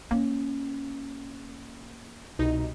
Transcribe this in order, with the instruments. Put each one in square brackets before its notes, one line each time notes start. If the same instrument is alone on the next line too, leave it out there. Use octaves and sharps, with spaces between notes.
[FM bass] A#3 [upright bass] C#4
[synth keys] C2 B2 D#4